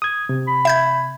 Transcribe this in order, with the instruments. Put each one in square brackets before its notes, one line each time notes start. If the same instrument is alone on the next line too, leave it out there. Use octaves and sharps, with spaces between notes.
[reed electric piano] D#6 G#6
C3
[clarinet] B5
[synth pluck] E5 G6 G#6